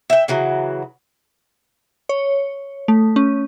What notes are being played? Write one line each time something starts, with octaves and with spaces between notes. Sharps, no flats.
E5 G5
C#3 E3 F#3
C#5
A3
C#4